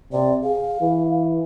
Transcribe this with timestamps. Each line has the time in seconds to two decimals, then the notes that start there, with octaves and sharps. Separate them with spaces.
0.12 C3 D5
0.43 G#4 F5
0.80 E3